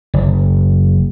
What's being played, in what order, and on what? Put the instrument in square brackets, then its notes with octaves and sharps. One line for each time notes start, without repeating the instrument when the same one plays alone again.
[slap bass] F#1